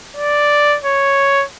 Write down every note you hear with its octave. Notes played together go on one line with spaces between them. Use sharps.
D5
C#5